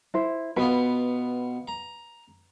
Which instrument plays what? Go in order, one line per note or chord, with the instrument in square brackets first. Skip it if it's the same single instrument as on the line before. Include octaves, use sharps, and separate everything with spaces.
[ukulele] E4 C5
[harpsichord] B2 B3 F4 [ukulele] B4
[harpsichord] A#5